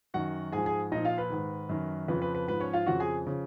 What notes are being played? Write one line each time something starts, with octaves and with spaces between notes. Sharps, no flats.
F#2 D#3 F#4 F#5
G#2 G#4 G#5
F3
G#4 G#5
A#2 F3 D#4 D#5
F4 F5
B4
G#2 D#3
F#2 D#3
F2 C#3 F3 B4
B4
B4
G#2 F3 B4
C#4 C#5
F4 F5
F2 C#3 F3 F#4 F#5
G#4 G#5
C#3 F3